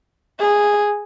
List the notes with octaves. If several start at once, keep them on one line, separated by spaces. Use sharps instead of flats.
G#4